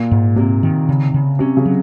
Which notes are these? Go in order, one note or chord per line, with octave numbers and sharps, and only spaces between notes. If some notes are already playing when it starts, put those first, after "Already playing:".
Already playing: A#2
G#2
C3 A#3
D#3
C#3
C#3
C3 C#4
C#3
F#3